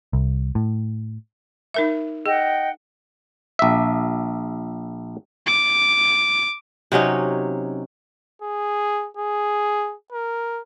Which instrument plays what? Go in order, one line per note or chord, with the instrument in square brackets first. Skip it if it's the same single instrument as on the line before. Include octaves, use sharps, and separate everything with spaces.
[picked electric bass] C2
A2
[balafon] D#4 A#4 E5
[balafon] G#4 [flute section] D#5 F#5 G5
[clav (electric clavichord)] A#1 E5
[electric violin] D6
[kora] C3 F#3 C#4 D#4
[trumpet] G#4
G#4
A#4